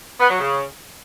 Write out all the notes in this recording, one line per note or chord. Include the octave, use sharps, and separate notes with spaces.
B3
F#3
C#3